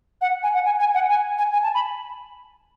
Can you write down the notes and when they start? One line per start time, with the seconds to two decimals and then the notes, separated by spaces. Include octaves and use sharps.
0.21 F#5
0.43 G#5
0.54 F#5
0.65 G#5
0.80 G#5
0.94 F#5
1.09 G#5
1.38 G#5
1.53 G#5
1.63 A5
1.74 B5